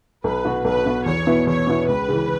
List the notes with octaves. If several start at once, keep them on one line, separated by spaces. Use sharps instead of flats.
B1 B4
B2 B3 F#4
B1 B4
B2 B3 F#4
E2 C#5
B2 B3 E4
E2 C#5
B2 B3 E4
C#2 B4
C#3 E3